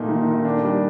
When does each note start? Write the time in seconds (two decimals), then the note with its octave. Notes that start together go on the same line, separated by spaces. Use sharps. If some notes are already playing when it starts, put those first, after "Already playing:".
Already playing: A#2 A3 D#4
0.09 D#3
0.27 D#3
0.45 D4
0.63 G3